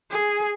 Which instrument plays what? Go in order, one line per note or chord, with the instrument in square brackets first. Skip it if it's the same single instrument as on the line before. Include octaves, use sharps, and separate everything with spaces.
[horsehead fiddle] G#4